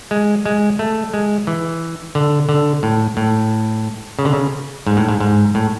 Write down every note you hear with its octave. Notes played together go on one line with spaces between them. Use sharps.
G#3
G#3
A3
G#3
E3
D3
D3
A2
A2
C#3
D3
C#3
G#2
A2
G#2
G#2
A2